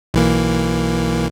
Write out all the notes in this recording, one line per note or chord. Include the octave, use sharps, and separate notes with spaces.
B1 E3 A#3